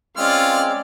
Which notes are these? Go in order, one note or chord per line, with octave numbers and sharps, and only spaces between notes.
G#3 C4 C#4 F4 D5 F6